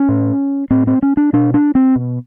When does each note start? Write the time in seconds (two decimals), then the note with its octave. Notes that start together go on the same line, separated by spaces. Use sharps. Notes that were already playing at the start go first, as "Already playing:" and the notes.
Already playing: C#4
0.09 A2
0.70 A2 C4
0.87 C4
1.02 C#4
1.17 D4
1.33 B2 D4
1.54 D4
1.75 C4
1.96 B2